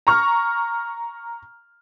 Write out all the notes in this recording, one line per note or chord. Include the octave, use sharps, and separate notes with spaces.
A#5 C#6 F6